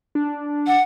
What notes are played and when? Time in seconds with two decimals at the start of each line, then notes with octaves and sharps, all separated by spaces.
0.15 D4
0.67 F#5